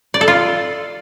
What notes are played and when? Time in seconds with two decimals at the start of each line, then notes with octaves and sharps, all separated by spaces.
0.14 D5
0.21 A4
0.28 F4